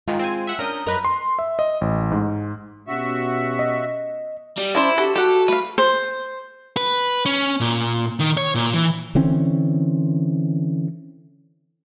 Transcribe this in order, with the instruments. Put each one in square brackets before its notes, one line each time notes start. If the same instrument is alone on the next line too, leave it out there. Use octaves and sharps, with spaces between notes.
[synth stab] G#2 D#3 [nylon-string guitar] G#3 F4
[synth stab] C4 G#5
E5 F#5
[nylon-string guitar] C#4 D4 [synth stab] A#4 D#6 G6
[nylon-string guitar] F#2 A#4 D#5 [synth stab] B4 A#5
[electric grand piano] C6
E5
D#5
A1
G#2
[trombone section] B2 C#4 G4 [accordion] F#4 E5
[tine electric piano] D#5
[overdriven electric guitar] G3
[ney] C#4 [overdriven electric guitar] E4 [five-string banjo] C5 D5 A5
[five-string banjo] F#4 A4 B5 [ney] G4
[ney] F#4 [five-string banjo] G4 F#5 [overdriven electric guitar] A4
[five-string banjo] A3 F5 [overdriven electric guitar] B4
[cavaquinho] C5
[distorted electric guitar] B4
C#4
A#2
D#3
C#5
A#2
E3
[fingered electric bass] D3 E3 C4 C#4